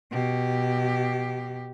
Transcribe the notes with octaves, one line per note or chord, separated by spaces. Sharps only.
B2 G4